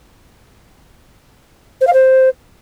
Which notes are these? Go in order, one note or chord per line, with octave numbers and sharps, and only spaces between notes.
C5
F5
C5